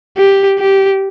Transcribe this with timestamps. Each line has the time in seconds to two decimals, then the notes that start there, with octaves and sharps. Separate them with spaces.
0.17 G4
0.59 G4